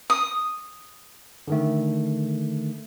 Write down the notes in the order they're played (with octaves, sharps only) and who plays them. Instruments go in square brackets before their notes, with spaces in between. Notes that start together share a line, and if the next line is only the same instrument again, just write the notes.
[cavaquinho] D#6
[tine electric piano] D3 D#3 A3